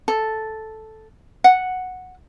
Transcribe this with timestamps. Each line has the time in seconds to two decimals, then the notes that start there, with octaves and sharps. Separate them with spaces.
0.08 A4
1.44 F#5